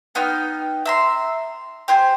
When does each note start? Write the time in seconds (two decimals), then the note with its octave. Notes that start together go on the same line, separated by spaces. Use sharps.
0.15 B3 D#4 G5 F6
0.86 E5 A#5 C6
1.88 G4 C5 G#5